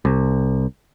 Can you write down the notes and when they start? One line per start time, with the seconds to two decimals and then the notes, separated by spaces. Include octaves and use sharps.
0.05 C2